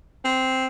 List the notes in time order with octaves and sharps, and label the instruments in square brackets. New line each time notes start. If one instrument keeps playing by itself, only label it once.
[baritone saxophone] C4